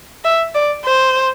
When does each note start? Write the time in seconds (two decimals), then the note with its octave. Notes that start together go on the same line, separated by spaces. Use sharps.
0.24 E5
0.55 D5
0.85 C5